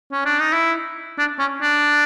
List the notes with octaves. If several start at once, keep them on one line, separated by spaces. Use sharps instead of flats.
C#4
D4
D#4
E4
D4
C#4
D4